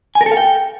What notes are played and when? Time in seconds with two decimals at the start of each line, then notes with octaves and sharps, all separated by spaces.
0.15 G#5
0.21 A#4
0.26 A4
0.32 F5
0.37 G5